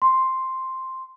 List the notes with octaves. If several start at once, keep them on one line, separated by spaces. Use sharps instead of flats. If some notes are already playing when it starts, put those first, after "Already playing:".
C6